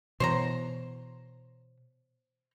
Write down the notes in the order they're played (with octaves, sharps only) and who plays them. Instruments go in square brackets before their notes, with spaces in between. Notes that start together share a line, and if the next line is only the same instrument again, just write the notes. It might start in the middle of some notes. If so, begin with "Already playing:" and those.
[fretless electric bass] B2 E3 [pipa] C5 C#5 A#5